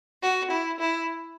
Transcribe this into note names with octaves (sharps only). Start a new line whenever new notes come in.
F#4
E4
E4